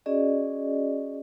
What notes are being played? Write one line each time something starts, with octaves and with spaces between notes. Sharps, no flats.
C#4 F#4 G#4 D5 D#5